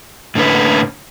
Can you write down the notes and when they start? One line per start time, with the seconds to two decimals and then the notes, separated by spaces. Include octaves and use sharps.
0.35 A2 D3 A#3 C#4 B4